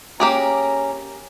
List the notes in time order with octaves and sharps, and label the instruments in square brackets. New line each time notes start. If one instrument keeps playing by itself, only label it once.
[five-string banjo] A#3 G4 G#4 [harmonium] C#4 A#5